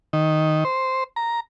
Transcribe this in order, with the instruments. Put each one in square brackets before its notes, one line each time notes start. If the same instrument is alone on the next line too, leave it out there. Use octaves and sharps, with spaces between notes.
[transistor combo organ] D#3
C5
A#5